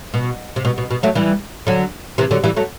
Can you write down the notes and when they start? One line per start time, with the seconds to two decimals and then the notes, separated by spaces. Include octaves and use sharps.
0.14 B2
0.56 C3
0.65 B2
0.78 B2
0.90 B2
1.03 F#3 A3
1.15 E3 G3
1.67 D3 F#3
2.18 C3 E3
2.31 D3 F#3
2.44 E3 G3
2.56 F#3 A3